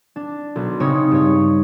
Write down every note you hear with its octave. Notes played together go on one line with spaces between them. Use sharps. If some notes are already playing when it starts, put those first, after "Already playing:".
D4
B1
C#3 C4 D#4 C#5
G2 C#5